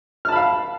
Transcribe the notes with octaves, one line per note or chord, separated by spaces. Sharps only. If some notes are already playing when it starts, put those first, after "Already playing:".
F5 A5 B5 F6